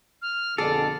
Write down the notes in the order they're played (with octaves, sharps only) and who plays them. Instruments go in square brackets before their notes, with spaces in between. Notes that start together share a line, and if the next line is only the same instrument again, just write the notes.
[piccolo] F6
[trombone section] F2 B2 D3 [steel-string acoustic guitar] G#4 [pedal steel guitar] A4 [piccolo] D6